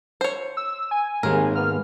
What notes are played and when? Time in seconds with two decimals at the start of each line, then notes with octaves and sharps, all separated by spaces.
0.21 C5 C#5
0.57 E6
0.91 G#5
1.23 D#2 G#2 D#3 G#3 A#4
1.55 A#3 B3 F6